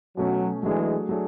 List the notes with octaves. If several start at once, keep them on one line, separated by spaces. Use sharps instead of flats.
B2 F#3 A3 C#4
E3 F#3 G#3 A3 D4 G#4
F#3 A3 D4 G#4